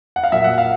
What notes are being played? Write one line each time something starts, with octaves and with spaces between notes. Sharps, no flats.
F#5
F5
A#2 F#3 A#3 E5
F#5
F5